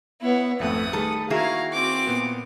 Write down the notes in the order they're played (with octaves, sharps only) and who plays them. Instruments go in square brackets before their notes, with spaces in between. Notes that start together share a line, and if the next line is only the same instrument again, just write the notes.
[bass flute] B3 [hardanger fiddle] E4 C#5
[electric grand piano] G#1 F2 B4 [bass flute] A3 [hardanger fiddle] F#5 D#6
[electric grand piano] D#3 G3 A3 [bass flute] G#4 [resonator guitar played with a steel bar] A4 B4
[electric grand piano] D#3 [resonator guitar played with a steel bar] A#3 E4 G#4 [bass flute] F#4 [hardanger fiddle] F5 A#5
[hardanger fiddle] C4 D6
[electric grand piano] A#2 B3